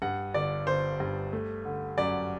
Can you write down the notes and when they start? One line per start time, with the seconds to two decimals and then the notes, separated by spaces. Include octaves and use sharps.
0.02 G2 F#5
0.34 G1 D5
0.67 G1 C5
1.00 G2
1.33 A3
1.65 D3
1.98 F#2 D5